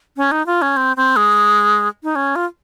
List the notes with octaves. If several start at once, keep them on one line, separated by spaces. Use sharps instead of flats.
C#4
D#4
F4
C#4
C4
C4
G#3
D#4
C#4
F4